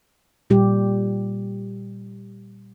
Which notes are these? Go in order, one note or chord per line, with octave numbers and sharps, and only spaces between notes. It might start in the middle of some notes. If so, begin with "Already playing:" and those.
A#2 G3 G4